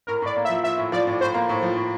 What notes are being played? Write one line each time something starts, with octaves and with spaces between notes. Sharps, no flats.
A2 A#4
A2 D5
A#3
F3 E5
F3 E5
A2
F3 D5
A2
A2 C5
A#3
A2
F3
A2